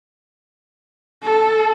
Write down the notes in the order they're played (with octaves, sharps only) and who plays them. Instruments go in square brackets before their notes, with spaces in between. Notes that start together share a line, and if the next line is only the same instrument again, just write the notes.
[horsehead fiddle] A4